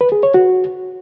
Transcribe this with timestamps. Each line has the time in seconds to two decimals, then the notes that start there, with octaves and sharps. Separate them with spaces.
0.01 B4
0.12 G#4
0.23 C#5
0.34 F#4